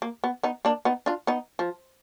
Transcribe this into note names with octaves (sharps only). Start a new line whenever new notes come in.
A#3
B3
B3 D#4
A#3 D4
B3 D#4
D4 F4
B3 D#4
F3